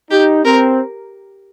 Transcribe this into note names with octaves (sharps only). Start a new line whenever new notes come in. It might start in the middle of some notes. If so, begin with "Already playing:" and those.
D#4 G4
C4 A#4